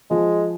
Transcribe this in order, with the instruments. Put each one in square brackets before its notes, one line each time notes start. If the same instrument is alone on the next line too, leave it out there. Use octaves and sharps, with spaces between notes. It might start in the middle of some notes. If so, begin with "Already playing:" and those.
[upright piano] F3 [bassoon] G#3